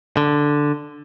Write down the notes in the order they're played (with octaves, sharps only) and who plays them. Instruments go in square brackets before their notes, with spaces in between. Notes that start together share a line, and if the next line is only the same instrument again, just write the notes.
[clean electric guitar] D3